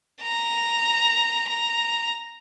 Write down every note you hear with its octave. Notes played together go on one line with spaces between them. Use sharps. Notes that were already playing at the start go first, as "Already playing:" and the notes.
A#5
A#5